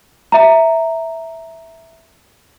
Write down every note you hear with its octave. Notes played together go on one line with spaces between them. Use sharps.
E5 A#5